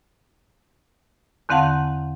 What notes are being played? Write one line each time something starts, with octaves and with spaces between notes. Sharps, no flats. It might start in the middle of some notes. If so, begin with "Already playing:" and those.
E2 D3 C4 F5 F#5 A5